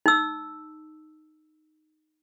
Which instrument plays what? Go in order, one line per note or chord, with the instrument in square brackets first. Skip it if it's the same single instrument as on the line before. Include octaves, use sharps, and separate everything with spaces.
[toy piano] D#4 E6